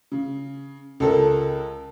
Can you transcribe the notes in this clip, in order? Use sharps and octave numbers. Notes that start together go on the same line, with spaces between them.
C#3
C#2 A4 A#4